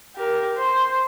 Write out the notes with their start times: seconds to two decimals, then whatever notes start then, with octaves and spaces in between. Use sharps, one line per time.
0.16 G4 A#4
0.57 C5